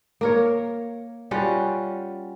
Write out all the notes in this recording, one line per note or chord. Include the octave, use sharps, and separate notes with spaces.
A#3 A#4 C#5
G3 C#4 F4 F#4